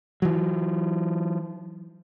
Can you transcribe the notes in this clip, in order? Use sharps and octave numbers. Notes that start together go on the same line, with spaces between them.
E3 F#3